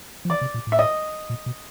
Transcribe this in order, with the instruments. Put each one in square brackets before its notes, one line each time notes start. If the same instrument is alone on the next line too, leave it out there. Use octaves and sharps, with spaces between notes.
[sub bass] F3
[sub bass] E3 [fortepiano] D5
[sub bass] C3
A#2
A2
[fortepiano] E5
D#5
[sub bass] A#2
B2